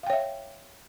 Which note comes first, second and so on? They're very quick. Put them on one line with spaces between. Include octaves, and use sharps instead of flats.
F5 G5 C#5 E5